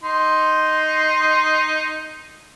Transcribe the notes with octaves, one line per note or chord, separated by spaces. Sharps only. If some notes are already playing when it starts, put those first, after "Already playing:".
D#4 C6